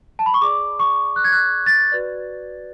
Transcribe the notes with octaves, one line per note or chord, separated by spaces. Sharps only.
A5
B5
C#6
G#4 D5 D6
C#6
F#6
G#6
F#6
A6
F#4 B4 D5